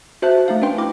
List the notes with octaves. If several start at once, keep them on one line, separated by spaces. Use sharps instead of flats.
F#4 C5 E5 A5 F#6
A3 D#4 F5
C#4 D4 B4 G5 C6
E4 D6